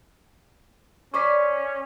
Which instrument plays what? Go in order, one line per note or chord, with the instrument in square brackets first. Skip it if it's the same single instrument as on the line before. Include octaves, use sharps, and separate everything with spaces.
[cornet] C#4 [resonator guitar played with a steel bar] B4 C5 D5 [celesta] C#6 D6 B6